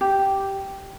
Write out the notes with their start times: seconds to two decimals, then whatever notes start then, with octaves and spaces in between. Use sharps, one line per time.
0.01 G4